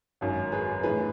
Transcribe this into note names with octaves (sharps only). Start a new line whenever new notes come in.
G#1 F#2 D#3 F#3
G#4 B4
A2 E3 G#4 B4